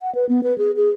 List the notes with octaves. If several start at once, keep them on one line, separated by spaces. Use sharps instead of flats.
F#5
B4
B3
B4
G#4
G#4